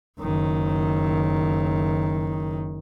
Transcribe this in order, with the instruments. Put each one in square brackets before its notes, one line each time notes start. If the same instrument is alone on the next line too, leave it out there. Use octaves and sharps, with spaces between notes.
[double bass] F#1 D#3